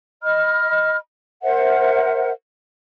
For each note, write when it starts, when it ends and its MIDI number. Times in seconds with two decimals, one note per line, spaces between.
0.23 0.96 75
0.23 0.96 83
0.23 0.96 89
1.43 2.30 70
1.43 2.30 72
1.43 2.30 76
1.43 2.30 78